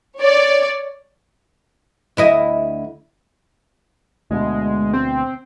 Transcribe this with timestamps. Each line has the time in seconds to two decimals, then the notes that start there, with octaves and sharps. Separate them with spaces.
0.20 C#5 D5
2.17 D2 E4 D#5
4.31 D2 B2 G#3
4.93 C4